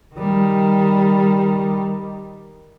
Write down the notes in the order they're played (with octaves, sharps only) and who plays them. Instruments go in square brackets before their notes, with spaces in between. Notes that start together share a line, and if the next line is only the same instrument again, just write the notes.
[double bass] D#3 G3